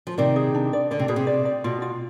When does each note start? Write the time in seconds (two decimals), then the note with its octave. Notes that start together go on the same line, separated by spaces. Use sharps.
0.07 F3
0.18 C3 D#3 D5
0.36 G#4
0.54 D4
0.73 D5
0.91 D3 D5
0.99 C3
1.08 B2 G#4
1.16 C3
1.27 D5
1.45 D5
1.64 B2 F4
1.82 F4